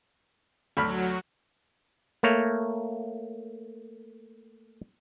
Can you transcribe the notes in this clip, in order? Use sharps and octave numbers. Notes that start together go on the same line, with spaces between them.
D2 F#3 B5 F6
A3 A#3 C#5